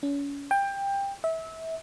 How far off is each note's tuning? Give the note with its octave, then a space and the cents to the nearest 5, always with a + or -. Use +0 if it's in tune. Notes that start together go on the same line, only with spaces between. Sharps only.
C#4 +35
G5 +20
E5 -25